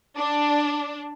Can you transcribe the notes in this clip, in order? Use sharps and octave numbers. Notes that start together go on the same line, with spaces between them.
D4